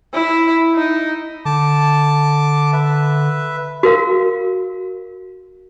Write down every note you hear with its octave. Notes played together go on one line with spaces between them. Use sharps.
E4
D#4
D3 A5 D6
B4 E5
F#4 A#4 F5